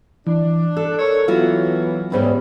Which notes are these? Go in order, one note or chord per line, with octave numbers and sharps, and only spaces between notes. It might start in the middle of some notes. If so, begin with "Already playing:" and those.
E3 D4
A4 F#6
A#4 C#5 E6
E3 F#3 B3 F4 F#4
D2 G#2 C#3 G3 B3 C#4